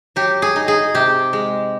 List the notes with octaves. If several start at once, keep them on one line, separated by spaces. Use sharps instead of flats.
F#3 G4
G#4
D#4
G#4
C3 G4
G#3